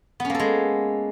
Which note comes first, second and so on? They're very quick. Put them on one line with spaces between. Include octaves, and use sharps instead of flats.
B3 C#4 A#3 A4 G#3